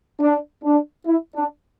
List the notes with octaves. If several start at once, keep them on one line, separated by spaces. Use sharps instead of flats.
D4
D4
E4
D4